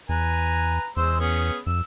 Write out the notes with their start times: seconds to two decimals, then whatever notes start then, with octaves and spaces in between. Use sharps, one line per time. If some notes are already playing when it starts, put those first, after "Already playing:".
0.09 E2 B4 G#5 A#5
0.97 E2 G#3 C5 E6
1.20 B3 C#4 G#4
1.67 F2 E6